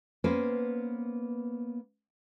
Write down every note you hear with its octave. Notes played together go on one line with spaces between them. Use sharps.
A#3 B3 C#4 B4 C5